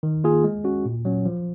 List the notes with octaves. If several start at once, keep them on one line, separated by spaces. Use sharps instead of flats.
D#3
A#3 F4 G#4
G#3
C#4 F#4
A#2
F#3 C#4
F3